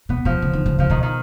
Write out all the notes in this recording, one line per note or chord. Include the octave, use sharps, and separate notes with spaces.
B2 B3
B2 F3
C#3
D#3
C#3
C#3 F3
B2 D#3
D#3